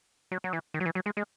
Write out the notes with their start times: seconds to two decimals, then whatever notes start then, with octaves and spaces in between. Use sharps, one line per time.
0.32 F#3
0.44 F#3
0.53 E3
0.74 D#3
0.80 F#3
0.86 E3
0.95 F#3
1.06 G#3
1.17 G#3